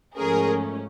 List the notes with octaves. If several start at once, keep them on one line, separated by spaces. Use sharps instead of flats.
G#2 F3 A3 C#4 G#4 A#4